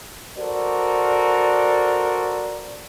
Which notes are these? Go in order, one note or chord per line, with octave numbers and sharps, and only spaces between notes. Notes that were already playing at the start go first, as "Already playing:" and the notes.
F#4 A4 A#4 C5 D5